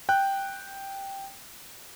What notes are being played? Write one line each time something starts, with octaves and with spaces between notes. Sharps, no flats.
G5 F#6